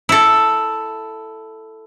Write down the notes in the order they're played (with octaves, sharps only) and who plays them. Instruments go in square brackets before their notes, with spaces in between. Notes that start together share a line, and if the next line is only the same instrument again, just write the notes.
[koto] E4 A4